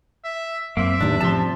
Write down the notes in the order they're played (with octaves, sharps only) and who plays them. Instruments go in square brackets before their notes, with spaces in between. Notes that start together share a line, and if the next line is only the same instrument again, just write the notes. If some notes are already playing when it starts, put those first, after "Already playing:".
[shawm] E5
[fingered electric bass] F#2 [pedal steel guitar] A#3 C4 [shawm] E5
[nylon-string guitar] E2 G3 [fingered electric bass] A2 D#3 [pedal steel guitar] D4
[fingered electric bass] A2 C#3 [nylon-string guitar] F3 G3 C4 [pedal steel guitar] A5 C6